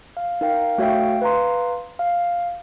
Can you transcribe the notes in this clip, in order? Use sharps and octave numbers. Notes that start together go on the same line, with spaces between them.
F5
D#4 A#4 F5 G5
A3 F#4 C#5 E5 F5 G5
B4 F5 A#5 C6
F5